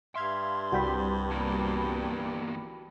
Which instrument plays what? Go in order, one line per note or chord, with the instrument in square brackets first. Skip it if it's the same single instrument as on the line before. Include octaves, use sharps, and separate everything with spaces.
[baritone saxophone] G2 [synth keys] E5 F5 G#6 [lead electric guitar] C6
[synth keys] C2 G3 C4 [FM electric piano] F#4 G5 B5
[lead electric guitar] E2 A#3